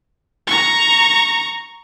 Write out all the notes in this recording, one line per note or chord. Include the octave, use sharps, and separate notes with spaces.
A#5 C#6